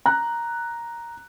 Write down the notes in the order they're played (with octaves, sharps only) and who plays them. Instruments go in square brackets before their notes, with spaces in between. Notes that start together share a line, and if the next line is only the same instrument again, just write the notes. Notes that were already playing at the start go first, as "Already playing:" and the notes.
[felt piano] A#5 F#6